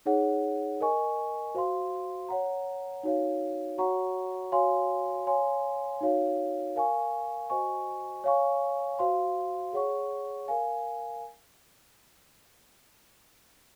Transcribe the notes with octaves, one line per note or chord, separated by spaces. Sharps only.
D#4 G#4 C#5 F#5
A#4 D#5 G#5 C#6
F#4 C5 F5 C6
C#5 F#5 A#5
D#4 F#4 C#5 F5
F#4 C#5 F#5 A#5 C#6
F#4 C#5 F5 G#5 C6
C#5 F5 G#5 C6
D#4 F#4 C#5 F5
A#4 F5 G#5 C#6
F#4 C5 D#5 G#5 C#6
C#5 F5 G#5 C#6
F#4 C5 F5 C6
G#4 C#5 F#5 C#6
A#4 F5 G#5